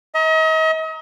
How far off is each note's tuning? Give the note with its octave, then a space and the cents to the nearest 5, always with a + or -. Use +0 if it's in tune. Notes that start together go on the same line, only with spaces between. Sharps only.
D#5 +40 A#5 +0